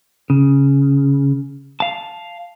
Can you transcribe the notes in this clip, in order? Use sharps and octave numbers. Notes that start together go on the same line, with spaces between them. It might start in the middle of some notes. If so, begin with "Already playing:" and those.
C#3
F5 A5